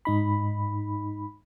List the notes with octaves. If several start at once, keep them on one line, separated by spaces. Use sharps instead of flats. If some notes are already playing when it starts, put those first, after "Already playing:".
G#2 D#4 B5